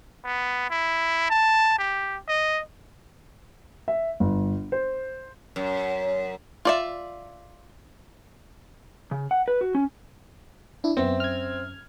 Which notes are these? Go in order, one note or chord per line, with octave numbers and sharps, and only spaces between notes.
B3
E4
A5
G4
D#5
E5
G1
C5
F#2
F4 D5 E5
C#3
F#5
B4
F#4
C#4
D4 E4
F#2 B3 C4 E5
F6 G#6